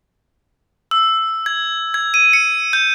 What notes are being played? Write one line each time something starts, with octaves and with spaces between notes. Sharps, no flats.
E6
G#6
G#6
D#7
C#7
G6